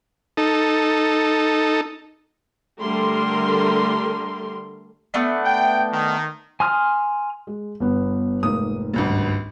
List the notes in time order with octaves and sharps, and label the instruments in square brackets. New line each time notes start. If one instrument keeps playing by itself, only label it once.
[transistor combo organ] D#4 A4
[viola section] D3 G3 A3 A#4 C6
[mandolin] A3 B3 D4
[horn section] G5
D#3
[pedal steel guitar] G#5 C6 D#6 F6
[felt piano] G#3
G1 B3
[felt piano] F1 G#2 A#3 [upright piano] D#6
[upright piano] G#1 C#2 G2